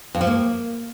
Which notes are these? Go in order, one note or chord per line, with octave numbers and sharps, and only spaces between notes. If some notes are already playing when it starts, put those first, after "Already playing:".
F2
F3
A#3